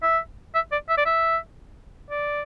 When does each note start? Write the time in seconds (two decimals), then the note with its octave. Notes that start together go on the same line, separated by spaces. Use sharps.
0.03 E5
0.55 E5
0.72 D5
0.89 E5
0.97 D5
1.06 E5
2.11 D5